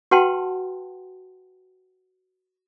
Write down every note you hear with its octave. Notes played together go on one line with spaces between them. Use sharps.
F#4 B4 F#5 G5 A5 C6